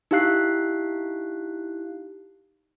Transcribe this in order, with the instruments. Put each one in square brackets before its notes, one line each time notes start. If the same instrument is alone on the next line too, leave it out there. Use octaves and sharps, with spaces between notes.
[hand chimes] D#4 E4 G4 F5 F#6 C7